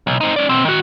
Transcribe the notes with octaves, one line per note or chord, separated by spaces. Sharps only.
B1
C4 D#4
C#4 D5
B2 C4
D#3 F#4